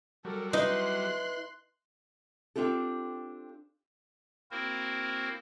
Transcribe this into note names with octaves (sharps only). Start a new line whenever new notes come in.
F#3 G3 A4 A#4
D#4 E4 B4 C6 F#6
C4 D4 F4 G4 A4
A#3 C4 E4 F#4 A#4 C5